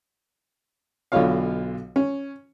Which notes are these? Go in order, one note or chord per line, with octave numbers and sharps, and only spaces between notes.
B1 B2 D3 F4 C#5 F5
C#4